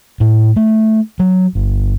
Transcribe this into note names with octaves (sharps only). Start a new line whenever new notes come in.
A2
A3
F#3
G1